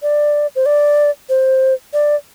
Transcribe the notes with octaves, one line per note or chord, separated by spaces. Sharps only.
D5
C5
D5
C5
D5